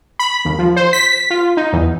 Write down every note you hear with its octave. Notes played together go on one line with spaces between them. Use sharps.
B5
D#2
F3
C5
B6
F4
D#4
E2